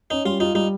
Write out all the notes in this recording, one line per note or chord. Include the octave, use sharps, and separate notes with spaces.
C#4 D#4
G3 F4
D#4 F4
G3 D#4